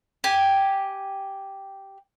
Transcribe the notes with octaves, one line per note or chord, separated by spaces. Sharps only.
G4 G#5